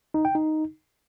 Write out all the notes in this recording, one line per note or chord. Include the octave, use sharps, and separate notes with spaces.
D#4
G5
D#4